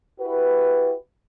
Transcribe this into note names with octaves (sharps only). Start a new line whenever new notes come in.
E4 F#4 G4 B4